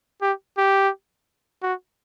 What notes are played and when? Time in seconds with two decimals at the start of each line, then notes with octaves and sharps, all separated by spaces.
0.21 G4
0.57 G4
1.62 F#4